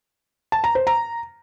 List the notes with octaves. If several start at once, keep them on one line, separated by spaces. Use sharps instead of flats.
A5
A#5
C5
A#5